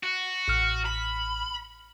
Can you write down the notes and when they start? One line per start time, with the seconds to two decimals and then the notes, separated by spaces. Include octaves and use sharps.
0.03 F#4
0.48 A1 F6
0.85 B5